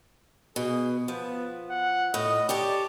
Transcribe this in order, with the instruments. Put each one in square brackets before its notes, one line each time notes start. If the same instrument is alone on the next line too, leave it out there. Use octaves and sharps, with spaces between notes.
[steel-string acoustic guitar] B2 [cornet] G#4
[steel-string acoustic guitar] F3 [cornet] B3
[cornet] F#5
[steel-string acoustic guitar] A2 [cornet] D#5
[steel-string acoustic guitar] G4 C#5 A5 [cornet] D5